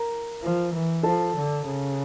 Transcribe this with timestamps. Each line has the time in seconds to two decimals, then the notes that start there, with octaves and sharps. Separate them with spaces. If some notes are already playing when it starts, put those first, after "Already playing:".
Already playing: A#4 A#5
0.42 F3
0.73 E3
1.03 F3 A4 A5
1.35 D3
1.66 C#3